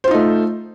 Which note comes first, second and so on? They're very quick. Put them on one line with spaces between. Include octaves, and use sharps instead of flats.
C5 F4 D#4 A3